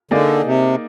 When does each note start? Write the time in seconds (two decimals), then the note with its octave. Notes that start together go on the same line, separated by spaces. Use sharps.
0.11 D3 A#3 D#4 G#4 D5
0.45 C3